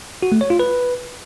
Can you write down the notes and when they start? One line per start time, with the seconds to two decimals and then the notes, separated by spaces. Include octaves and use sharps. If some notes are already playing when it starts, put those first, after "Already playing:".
0.23 F#4
0.32 A3
0.41 C#5
0.50 F4
0.59 B4